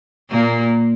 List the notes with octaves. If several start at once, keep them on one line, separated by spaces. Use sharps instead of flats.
A#2 A#3